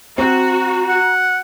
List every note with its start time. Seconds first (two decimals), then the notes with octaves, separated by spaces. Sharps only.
0.18 C4 F#4 A#5
0.88 F#5